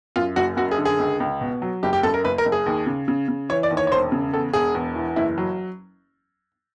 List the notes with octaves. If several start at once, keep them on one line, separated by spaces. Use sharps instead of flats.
F#2 F4
F#1 F#4
F#2 F#4
G#4
D3
G#4
C#2
C#2
B2
F#3
F#1 G4
G4
F#2 A4
A#4
F#1 B4
A#4
F#1
G#4
D#2
C#3
C#3
C#3
E3 C#5
D5
D#2
C#5
C#5
E1 C5
C#3
E2 A4
E1 G#4
E2
E3
F#1 E4
F#3